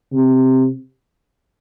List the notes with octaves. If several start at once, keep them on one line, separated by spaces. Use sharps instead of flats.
C3